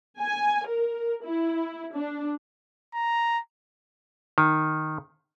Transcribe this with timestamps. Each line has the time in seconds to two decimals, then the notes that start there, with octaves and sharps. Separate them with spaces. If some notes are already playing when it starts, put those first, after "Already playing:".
0.20 G#5
0.66 A#4
1.26 E4
1.94 D4
2.94 A#5
4.38 D#3